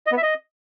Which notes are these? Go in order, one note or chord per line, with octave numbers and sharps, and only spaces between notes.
D#5
B3
E5
D#5